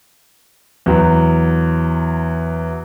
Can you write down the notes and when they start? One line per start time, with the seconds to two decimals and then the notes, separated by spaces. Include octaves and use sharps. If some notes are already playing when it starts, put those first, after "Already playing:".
0.86 E2 F#3